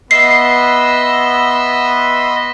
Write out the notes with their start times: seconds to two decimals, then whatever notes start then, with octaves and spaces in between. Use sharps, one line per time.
0.11 B3 D#5 E5 C6 E6 C7